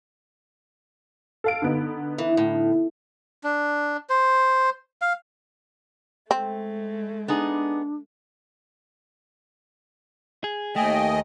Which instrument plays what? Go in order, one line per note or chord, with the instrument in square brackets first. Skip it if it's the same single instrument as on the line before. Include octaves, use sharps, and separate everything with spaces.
[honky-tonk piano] A4 F5 D7
D3 B3 D#4
[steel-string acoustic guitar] E3
A2
[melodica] D4
C5
F5
[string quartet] G#3 A3 [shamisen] C4
[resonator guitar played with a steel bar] B3 D#4 G#4 [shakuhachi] D4
[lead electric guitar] G#4
[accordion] D#2 D#5 [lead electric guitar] A3 [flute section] G5 G#5